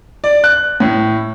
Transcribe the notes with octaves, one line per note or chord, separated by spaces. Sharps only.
D5
F#6
A2